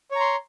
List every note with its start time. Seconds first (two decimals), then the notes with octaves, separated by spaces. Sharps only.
0.11 C#5
0.16 A#5
0.20 C6